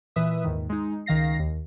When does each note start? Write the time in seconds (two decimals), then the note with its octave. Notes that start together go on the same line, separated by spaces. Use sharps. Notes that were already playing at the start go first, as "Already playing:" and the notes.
0.16 A#2 E3 B4 E5 D#6
0.44 D#2 G#2 D#3
0.69 G#3 D#4
1.06 C#2 D#3 F5 A#6 C7
1.39 D#2